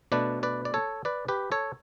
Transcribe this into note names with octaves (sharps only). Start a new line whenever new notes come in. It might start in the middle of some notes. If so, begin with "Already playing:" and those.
B2 A3 D4 B4 D5
B4 D5
D5
A4 C#5
B4 D5
G4 B4
A4 C#5